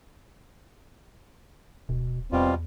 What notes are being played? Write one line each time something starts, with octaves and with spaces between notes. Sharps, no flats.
D1 B2
E2 B2 G3 C4 F4